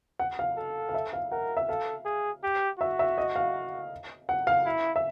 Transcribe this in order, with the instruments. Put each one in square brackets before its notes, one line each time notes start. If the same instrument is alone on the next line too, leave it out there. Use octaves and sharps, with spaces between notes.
[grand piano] F#5
F5
[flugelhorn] A4
[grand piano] F5
E5
F5
[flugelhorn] A#4 [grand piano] F#5
[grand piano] E5
[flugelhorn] A4 [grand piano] F5
[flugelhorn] G#4
G4
[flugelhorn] F#4 [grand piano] E5
[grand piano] E5
D#5
F5
F#5
F5
[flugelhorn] E4
[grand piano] E5